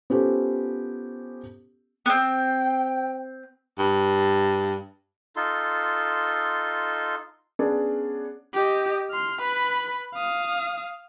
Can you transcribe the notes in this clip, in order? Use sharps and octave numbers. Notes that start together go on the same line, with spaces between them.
B3 C#4 F4 G4 A4 C5
B3 C4 G5
G2
D#4 F4 A4 C6
B3 C#4 D4 G#4
G4 D#5
C6 F6
B4 B5
F5 D#6